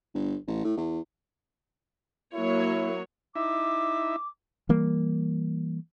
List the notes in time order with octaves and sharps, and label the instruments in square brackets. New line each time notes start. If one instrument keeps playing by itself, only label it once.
[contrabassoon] G1
A1
A2
E2
[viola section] F#3 A#3 C#5 [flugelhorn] E4
[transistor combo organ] D#4 E4 E5 [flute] D6
[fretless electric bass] E3 G3 A#3